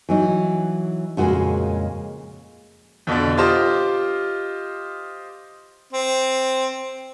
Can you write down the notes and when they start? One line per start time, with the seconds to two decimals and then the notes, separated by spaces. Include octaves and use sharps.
0.09 E3 F#3 D#4
1.17 F2 A#2 C#3 G#3 A#3 F#4
3.07 F2 B2 D3 D4
3.37 F4 G4 C5 D#5 D6
5.93 C4